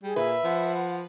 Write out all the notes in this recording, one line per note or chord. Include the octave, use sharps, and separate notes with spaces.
G3 G#4
A#2 B4 E5
F3 F#5